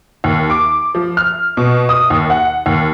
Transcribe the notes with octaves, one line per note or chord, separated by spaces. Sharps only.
D#2
D6
F3
F6
B2
D#6
D#2
F#5
D#2